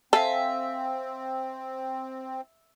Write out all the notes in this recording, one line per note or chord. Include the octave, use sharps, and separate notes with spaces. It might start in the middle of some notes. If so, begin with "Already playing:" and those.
C4 A4 E5 F5 G#5